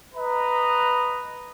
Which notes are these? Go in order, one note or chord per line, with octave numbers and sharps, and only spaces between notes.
B4 D#5 A#5